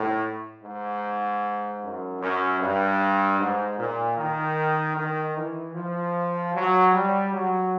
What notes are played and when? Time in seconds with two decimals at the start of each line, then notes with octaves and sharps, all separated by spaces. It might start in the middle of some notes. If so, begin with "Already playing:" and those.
Already playing: A2
0.63 G#2
1.82 F#2
2.21 F#2
2.60 G2
3.39 G#2
3.78 A#2
4.17 D#3
4.96 D#3
5.35 E3
5.74 F3
6.54 F#3
6.93 G3
7.31 F#3